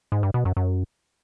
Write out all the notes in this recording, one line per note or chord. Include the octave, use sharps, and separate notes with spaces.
G#2
G2
B2
F#2
F#2